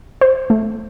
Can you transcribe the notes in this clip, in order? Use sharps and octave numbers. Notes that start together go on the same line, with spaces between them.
C5
A3